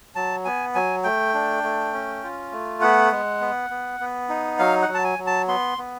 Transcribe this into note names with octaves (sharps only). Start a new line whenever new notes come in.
F#3 A5
B3 G#5
F#3 G#5
A3 G5
D4
A3
C#4
F4
A3
B3 F#5
G#3
B3
B3
B3
D#4
F#3 F5
F#5
F#3
A5
G#5
F#3
A5
B3 C6
B3